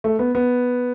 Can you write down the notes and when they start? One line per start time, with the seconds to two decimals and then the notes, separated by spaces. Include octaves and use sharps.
0.04 A3
0.19 B3
0.35 B3